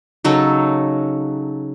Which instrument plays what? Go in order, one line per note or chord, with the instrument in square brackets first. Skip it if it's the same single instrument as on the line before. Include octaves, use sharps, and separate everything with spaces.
[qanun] C#3 F#3 D#4 A4